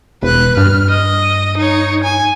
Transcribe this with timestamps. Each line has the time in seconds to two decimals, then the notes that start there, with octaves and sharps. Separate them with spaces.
0.23 E1 B4 F#6
0.57 G2 F6
0.89 D#5
1.57 D#4 C#5
2.03 G#5